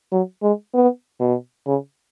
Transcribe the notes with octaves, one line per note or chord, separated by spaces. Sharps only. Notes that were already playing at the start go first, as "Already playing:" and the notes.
F#3
G#3
B3
B2
C#3